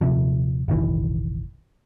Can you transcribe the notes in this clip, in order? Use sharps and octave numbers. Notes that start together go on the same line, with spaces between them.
D#1 C2 C3 F3
F1 A#1 D#3 E3